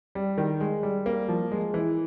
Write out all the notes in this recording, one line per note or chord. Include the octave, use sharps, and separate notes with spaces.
G3
D#3
G#3
G3
A#3
F3
G#3
E3